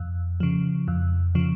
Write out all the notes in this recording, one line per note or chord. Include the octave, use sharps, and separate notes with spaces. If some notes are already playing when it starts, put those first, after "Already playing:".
Already playing: F2
C#3 F3
F2
C#3 F3